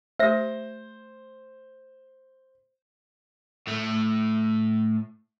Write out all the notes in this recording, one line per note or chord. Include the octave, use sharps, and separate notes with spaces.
A3 G4 C5 E5 A#6
A2 A3